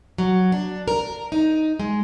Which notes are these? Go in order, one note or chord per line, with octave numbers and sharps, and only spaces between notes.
F#3
D4
A#4
D#4
G#3